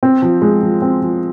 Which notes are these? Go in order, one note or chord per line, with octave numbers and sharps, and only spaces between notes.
C4
F3
G#3
F3
C4
F3